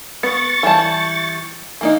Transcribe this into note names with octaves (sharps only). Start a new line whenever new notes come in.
B3 C#6 A6
E3 G3 A5
E3 A#3 D#4